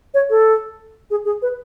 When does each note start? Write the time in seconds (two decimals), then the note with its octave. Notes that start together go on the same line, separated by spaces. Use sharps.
0.14 C#5
0.30 A4
1.11 G#4
1.25 G#4
1.42 B4